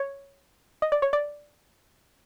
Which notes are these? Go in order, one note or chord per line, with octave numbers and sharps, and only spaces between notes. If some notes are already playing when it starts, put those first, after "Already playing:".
Already playing: C#5
D#5
D5
C#5
D5